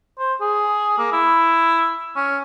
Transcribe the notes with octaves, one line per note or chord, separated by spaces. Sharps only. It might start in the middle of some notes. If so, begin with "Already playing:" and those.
C5
G#4
A#3
E4
C#4